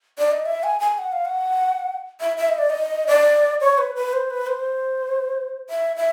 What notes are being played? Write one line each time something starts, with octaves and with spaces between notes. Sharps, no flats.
D5
D#5
E5
G#5
G#5
F#5
F5
F#5
E5
E5
D#5
D5
D#5
D5
C#5
B4
B4
C5
B4
C5
E5
E5